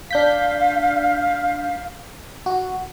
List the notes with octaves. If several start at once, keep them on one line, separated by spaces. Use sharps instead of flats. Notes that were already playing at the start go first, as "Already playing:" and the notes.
D4 F5 G6 B6
F#4